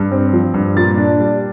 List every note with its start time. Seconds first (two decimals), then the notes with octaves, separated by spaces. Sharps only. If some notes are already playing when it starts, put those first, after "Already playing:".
Already playing: G2
0.11 C4
0.33 F3
0.54 G2
0.76 A#2 A6
0.98 D4
1.20 G3